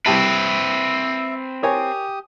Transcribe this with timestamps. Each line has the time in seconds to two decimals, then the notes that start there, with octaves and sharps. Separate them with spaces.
0.06 C2 C4 G4 B4 E5 A5
1.63 G4 A#4 C#5 G#5 D#6